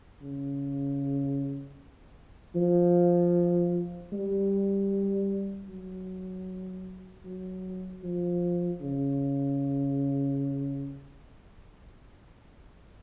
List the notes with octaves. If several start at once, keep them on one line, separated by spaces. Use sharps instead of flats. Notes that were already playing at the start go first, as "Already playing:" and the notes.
C#3
F3
G3
F#3
F#3
F3
C#3